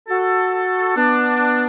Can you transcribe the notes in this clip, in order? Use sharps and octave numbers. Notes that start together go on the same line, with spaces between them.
F#4 A4
B3 D4